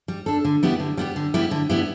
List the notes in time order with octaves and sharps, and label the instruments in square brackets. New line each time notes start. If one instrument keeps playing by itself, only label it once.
[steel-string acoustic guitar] G3
D4 A4
D3
G3 B3 E4 G4
D3
G3 B3 E4 G4
D3
G3 B3 E4 G4
D3
G3 B3 E4 G4